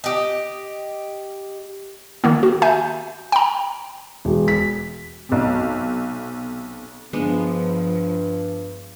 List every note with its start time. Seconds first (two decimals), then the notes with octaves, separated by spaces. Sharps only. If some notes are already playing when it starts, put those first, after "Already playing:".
0.04 G4 D#5
2.24 D#3 A#3 B3
2.43 F#4
2.62 E5 G#5 G6
3.32 G5 A#5
4.25 E1
4.48 B6
5.29 B1 C3
7.13 G2 F3 G#3 B3 D4